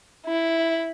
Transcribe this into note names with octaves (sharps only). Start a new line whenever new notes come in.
E4